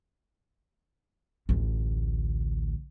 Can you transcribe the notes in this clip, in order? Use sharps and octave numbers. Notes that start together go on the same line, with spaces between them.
A1 D2